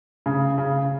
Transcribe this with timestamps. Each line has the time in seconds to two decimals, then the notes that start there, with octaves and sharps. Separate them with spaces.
0.26 C#3
0.58 C#3